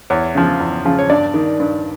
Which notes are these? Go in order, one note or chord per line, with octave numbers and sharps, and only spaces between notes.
E2 C#5
C#3 F3
E2
C#3 F3
C#5
G2 D5
D#3
G2